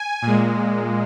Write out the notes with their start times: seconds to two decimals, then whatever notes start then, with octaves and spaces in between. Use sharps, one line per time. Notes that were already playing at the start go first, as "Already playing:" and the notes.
Already playing: G#5
0.22 A#2
0.27 G#3